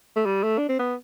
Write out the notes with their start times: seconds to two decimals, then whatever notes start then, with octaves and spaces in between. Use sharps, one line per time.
0.17 A3
0.26 G3
0.43 A3
0.58 D4
0.69 C4
0.79 B3